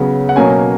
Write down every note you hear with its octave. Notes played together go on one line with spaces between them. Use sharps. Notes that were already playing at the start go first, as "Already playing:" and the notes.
Already playing: C#3 F#3 B3
F#5
B2 F#3 A#3 C#4 G#5